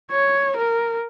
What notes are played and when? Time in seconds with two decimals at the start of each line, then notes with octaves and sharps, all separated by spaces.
0.11 C#5
0.57 A#4